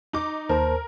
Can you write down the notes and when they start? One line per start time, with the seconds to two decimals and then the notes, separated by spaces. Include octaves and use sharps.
0.13 D#4 D6
0.49 D#2 A#4 C5 A5